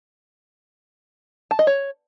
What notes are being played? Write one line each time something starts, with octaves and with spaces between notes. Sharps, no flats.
A5
D#5
C#5